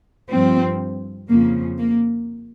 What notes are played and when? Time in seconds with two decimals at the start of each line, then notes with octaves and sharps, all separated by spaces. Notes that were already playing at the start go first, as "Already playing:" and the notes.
0.31 G2 F3 C4
1.29 F2 C#3 F3 A#3
1.78 A#3